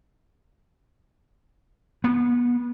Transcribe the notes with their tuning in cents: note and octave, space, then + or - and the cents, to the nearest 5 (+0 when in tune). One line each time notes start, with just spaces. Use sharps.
B3 -25